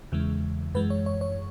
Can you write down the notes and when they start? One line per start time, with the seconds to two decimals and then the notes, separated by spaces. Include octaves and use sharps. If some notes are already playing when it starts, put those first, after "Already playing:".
0.12 E2 C#3 E3 G#3
0.75 F#2 E3 G#3 B4
0.90 C#5
1.06 C#5
1.21 C#5